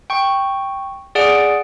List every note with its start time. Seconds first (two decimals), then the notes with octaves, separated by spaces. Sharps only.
0.10 G5 C#6
1.15 G#4 D5 F#5 D7